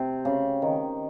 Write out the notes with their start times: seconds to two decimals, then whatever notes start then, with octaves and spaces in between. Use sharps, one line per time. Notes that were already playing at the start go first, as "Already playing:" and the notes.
Already playing: C3
0.25 C#3
0.62 D#3